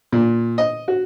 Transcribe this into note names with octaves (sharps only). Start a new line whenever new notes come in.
A#2
D#5
F#4